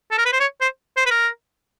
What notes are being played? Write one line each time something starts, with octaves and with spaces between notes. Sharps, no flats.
A4
A#4
B4
C5
C#5
C5
C5
B4
A#4